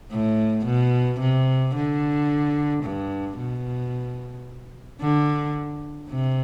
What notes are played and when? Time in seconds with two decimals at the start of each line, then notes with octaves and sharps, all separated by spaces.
0.11 A2
0.65 B2
1.20 C3
1.75 D3
2.83 G2
3.38 B2
5.01 D3
6.10 C3